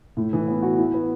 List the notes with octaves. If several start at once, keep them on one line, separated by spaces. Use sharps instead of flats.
A2
E3
B3
F#4
E4
B3